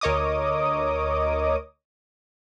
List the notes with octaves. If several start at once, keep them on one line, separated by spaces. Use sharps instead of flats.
D2 A#4 C#5 D#5 D6 D#6